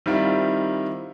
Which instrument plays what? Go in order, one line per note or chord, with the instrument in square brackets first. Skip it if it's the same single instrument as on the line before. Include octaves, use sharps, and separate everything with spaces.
[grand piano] D#3 G3 C4 E4 F4